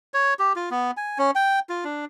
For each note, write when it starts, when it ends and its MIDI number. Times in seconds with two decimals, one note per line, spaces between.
0.14 0.34 73
0.39 0.53 67
0.56 0.69 65
0.71 0.91 59
0.97 1.18 80
1.18 1.31 61
1.35 1.60 79
1.69 1.84 65
1.84 2.05 62